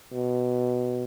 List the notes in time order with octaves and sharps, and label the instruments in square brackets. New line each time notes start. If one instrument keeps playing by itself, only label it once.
[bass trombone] B2